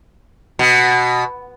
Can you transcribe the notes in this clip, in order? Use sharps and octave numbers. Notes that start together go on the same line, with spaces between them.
B2